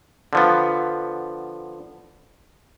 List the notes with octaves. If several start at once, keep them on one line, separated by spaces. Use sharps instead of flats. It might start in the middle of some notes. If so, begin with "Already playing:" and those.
D3 F3 B3